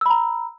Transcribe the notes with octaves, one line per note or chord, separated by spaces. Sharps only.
A#5 B5 E6